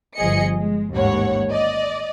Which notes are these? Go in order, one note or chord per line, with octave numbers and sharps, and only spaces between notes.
G1 F3 G#4 D#5 C#7
G#3
A1 D#2 G#2 C#5 F#5
D5 D#5